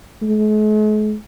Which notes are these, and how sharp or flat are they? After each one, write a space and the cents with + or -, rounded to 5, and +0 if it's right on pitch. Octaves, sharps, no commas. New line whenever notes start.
G#3 +45